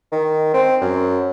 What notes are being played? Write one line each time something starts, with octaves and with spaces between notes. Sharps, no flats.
D#3
C4
F#2